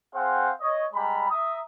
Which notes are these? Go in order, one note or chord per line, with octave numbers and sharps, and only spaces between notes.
C4 G#4 C5 F5 F#5
C#5 D#5
G3 G#3 A#5 B5
E5 A#5 D#6